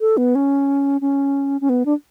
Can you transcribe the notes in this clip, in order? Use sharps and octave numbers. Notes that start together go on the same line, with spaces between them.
A4
B3
C#4
C#4
C#4
B3
D4